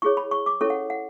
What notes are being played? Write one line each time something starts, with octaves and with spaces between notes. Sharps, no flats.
E4 G#4 C#5 C#6
B5
C#6
D6
C#4 E4 A4 C#5 C#6
F#5
F#5